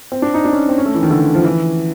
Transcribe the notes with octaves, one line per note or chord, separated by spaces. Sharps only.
C4
D4
D#4
D4
C#4
C4
C#4
A3
E3
D#3
D3
F3
E3